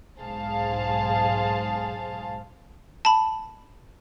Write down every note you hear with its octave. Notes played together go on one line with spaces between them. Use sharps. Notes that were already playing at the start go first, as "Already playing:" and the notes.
B1 G#2 G#4 C5 F5 A5
A5 B5